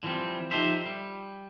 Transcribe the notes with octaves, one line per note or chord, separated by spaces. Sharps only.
D3 E3 F3 G3 C4
F3 D#4 G4 A4 C5 E5
G3